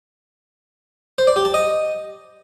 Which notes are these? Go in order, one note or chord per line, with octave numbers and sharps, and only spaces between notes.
C5
D5
G4
A5
D#5